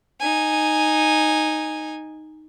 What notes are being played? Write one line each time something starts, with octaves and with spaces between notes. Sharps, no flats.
D#4 G#5